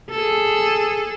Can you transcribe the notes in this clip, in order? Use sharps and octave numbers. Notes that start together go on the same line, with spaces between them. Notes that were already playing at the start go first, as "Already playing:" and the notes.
G#4 A4